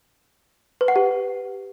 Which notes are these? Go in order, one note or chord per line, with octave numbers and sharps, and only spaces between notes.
B4
F#5
G4